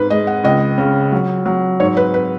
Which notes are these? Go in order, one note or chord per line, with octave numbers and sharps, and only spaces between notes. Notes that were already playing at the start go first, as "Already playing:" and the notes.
Already playing: G#2 B4
G#3 D#5
F#5
C#2 D#5
C#3
F#3
F#3
G#2 C#5
B4
B4